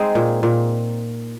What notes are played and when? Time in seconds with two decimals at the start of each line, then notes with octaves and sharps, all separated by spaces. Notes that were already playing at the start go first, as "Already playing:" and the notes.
Already playing: G#3 C4 D#4
0.15 A#2
0.43 A#2